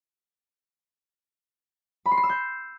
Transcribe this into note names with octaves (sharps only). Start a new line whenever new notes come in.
B5
C6
C7
E6
G6